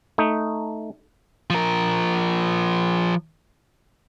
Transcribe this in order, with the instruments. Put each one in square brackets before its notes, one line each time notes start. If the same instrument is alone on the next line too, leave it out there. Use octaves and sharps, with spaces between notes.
[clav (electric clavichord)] A3 D#4
[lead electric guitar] F3 A#4